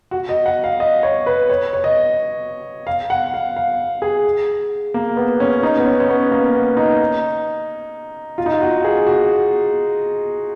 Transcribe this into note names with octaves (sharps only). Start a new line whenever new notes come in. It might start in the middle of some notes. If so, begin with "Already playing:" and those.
F#4
D#5
F#5
F5
D#5
C#5
B4
C#5
C#5
D#5
F5
F#5
F5
F5
G#4
A#3
B3
C#4
D#4
B3
C#4
C#4
B3
A#3
B3
D#4
F4
D#4
F4
F#4
G#4
F#4